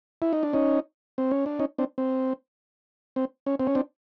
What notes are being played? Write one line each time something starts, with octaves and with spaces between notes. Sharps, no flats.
E4
D#4
D4
C#4 D#4
C4
C#4
D4
C#4 D#4
C4 D4
C4
C4
C#4
C4
C#4
C4 D4